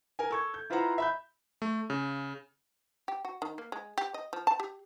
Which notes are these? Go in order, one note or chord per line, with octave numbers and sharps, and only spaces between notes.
A#4 G#5
A4 C#6 G#6
G6
E4 F4 B4 C5 F#5 A#5
E5 B5 G6
A3
C#3
G4
F#4
D#3
A#3
G#3
G4
D#5
F3
A5
G4